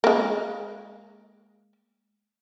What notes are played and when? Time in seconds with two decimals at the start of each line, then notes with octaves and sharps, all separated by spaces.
0.04 G#3 A#3